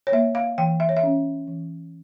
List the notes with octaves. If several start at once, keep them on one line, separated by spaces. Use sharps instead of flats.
C#5
A#3 E5
F5
E3 G5
E5
C#5
E5
C#4
E3